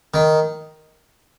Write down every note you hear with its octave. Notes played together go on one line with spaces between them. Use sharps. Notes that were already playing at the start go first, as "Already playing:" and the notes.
D#3